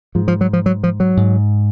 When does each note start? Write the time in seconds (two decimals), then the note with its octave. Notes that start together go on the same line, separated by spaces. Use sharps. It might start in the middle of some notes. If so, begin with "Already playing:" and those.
0.15 G#2 F3
0.28 F3
0.41 F#3
0.53 F3
0.66 F#3
0.83 F3
1.00 F#3
1.17 G#2